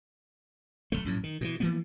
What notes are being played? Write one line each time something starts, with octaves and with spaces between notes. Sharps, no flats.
B1 F2 A3
A#1 F#2 A2
D#3
B2 D3 E3
E3 F3 A#3 B3